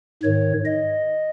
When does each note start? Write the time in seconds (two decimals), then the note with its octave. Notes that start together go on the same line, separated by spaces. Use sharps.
0.23 G#2 D#3 C#5
0.65 D#5